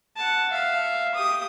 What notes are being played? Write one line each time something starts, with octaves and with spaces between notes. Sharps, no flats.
F#5 A5
E5 F5
G4 D#6